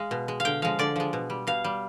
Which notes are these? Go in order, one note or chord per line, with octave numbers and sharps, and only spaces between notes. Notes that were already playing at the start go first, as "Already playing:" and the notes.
Already playing: G#3 F5
B2
G#3
F5
D3 G5
F3 G#3 F5
D3 D5
F3 G#3
B2
G3
B2 F5
G3